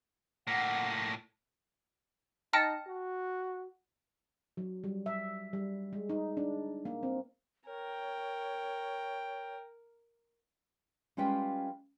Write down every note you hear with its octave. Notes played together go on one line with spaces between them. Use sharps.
A2 A#3 F#5
D#4 G5 A5 F6 A#6 C#7
F#4
F#3
G3
E5
G3
G#3
D#4
D4
A#3
C4
A#4 C#5 G5
G3 G#3 C#4 F4 B4 G5